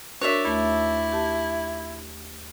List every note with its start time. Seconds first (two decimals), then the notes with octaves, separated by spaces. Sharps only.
0.21 D4 F#4 A#4 C#5 D5 E5
0.45 D#2 A3 E4 A5
1.12 G4 A5